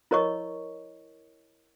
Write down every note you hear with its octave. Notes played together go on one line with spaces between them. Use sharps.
E4 A#4 C#5 D#5 C#6